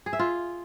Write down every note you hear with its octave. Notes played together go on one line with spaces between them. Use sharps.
G#4
E5
F4